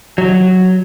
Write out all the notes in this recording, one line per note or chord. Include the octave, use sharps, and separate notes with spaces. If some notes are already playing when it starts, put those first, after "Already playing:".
F#3